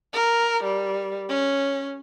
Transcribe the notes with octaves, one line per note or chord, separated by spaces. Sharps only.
A#4
G3
C#4